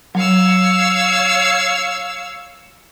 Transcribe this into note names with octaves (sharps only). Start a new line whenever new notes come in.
F#3 C#5 F5 E6